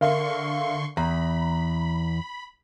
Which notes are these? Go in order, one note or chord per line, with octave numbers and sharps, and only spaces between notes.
D3 A#4 E5 F5 C6 C#6
E2 A#5 B5